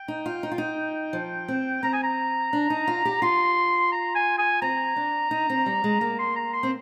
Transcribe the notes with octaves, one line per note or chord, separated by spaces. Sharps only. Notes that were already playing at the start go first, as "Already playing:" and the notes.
Already playing: G5
D#4
F4
D#4
F4
D#4
F3
C4
C4 A#5
G#5
A#5
D4
D#4
F4
G4
F4 C6
A#5
G#5
G#5
C4 A#5
D4
D#4
C4
G3
G#3
A#3 A#5
C6
A#5
C6
C4